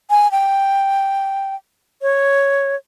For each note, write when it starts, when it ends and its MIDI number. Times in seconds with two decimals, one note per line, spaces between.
0.10 0.30 80
0.32 1.55 79
2.02 2.76 73